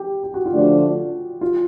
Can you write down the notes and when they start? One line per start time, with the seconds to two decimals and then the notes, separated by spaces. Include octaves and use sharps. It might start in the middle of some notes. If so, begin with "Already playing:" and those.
Already playing: G4
0.23 G4
0.34 F#4
0.46 F4
0.53 D3 F3 A3 D4 F#4
1.41 F4